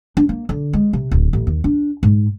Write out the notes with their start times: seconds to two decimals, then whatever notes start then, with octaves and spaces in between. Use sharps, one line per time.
0.17 D4
0.29 A#3
0.49 D3
0.73 G#3
0.93 C3
1.11 D1
1.33 A1
1.47 D#2
1.64 D4
2.03 G#2